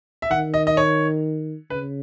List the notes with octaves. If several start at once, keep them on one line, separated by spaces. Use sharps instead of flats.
E5
D#3 F#5
D#5
D#5
C#5
C#3 B4